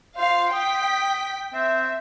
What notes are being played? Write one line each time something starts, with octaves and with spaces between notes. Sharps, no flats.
F4 C5 F5
G5 D#6 B6
C4 E5